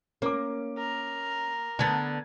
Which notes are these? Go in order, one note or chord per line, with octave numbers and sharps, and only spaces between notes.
A#3 C#4 D6
A#4
D3 B3 A5 G#6 A6